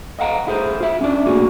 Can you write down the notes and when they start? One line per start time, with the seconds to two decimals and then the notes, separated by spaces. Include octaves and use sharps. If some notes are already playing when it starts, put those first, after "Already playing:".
0.19 D#5 F5 F#5 A#5
0.47 E4 G#4 C5
0.80 F4 E5
1.01 C#4 D4 D5
1.26 A2 A#3 F#4 G#4